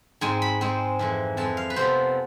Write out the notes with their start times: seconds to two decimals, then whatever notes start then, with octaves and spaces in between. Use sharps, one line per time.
0.21 G#2 G#3 C4 G#5
0.42 B5
0.61 G#2 G#3 C4
0.99 F2 E3 G#3
1.37 F2 E3 G#3 A5
1.57 F5
1.70 B4
1.76 F2 C3 F3 B3 C5